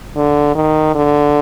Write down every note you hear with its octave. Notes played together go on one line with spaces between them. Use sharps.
D3
D#3
D3